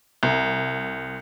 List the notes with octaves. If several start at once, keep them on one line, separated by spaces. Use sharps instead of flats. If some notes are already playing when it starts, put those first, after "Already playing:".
C2